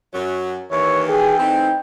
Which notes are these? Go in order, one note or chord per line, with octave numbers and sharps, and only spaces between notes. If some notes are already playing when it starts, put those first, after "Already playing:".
F#2 F#3
D#2 E3 C#5
G#4 G5
E3 A3 C4 D#4